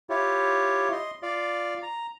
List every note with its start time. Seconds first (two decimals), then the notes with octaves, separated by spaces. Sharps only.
0.10 E4 F4 G4 C#5
0.92 D#5 C6
1.23 F4 D5 F5
1.83 A#5